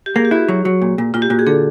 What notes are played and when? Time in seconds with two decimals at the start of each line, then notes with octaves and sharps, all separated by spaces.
0.06 G4
0.16 A#3 G#4
0.25 G4
0.31 E4 F#4
0.48 F#3
0.65 F#3
0.82 A#2
0.98 A#2
1.14 A#2 F4
1.22 G4
1.30 A#2 F#4
1.39 G#4
1.46 D3 A4